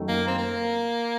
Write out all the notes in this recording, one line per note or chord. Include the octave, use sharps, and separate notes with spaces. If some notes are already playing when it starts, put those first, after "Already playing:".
Already playing: F#2 D#3 A3 C#4 F#4
A#3
C4
A#3